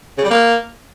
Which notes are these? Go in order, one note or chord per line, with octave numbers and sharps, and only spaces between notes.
C#3
G3
A#3